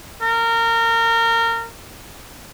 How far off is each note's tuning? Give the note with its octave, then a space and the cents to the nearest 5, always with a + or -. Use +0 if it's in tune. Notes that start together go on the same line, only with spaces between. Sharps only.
A#4 -25